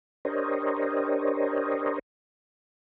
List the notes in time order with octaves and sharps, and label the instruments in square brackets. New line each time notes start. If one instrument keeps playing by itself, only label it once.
[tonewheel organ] D4 G4 A#4 C5 C#5 D#5